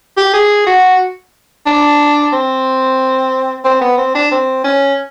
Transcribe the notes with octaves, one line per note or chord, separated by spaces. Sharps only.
G4
G#4
F#4
D4
C4
C4
B3
C4
D4
C4
C#4